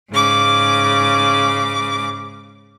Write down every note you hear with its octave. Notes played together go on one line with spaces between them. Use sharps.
G#2 C#3 D6